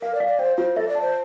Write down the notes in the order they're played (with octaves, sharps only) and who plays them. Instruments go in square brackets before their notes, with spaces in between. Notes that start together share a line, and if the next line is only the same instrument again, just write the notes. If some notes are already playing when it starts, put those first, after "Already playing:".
[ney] A#4 [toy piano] F5
[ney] D5
[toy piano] F5
[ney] D5
[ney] C5 [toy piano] G5
[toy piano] F4 [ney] C5
[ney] A4 [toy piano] E5
[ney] D5
[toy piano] A5
[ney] C5